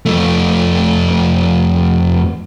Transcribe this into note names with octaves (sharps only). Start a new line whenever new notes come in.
F2 A3